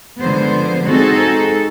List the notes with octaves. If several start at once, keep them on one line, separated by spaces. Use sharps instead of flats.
D3 F3 G#3 B3 C5
G#3 C4 D#4 F#4 G#4 A4